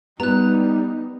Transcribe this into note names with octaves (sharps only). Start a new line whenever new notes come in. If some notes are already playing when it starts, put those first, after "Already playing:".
G3 B3 D#4 A#5 F#6